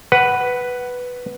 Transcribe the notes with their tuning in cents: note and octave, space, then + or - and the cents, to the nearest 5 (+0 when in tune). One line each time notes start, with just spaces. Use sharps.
B4 +0 F#5 +15